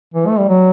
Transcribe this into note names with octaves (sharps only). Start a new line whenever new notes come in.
E3
A3
G3
F#3